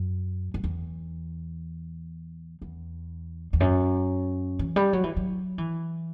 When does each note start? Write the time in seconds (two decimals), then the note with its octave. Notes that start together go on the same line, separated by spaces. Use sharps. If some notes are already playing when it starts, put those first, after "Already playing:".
Already playing: F#2
0.54 F#2
0.64 E2
2.62 E2
3.53 E2
3.60 F#2
4.59 E3
4.76 G3
4.93 F#3
5.04 E3
5.16 F#3
5.58 E3